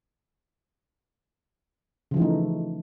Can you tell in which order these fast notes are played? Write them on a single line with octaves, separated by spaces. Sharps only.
C#3 F3 E3 D#4 A3